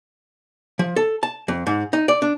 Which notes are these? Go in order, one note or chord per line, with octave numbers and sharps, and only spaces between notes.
F3
A4
A5
F2
G#2
D#4
D5
D4